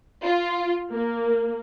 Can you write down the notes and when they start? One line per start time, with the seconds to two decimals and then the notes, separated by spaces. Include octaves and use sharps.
0.24 F4
0.92 A#3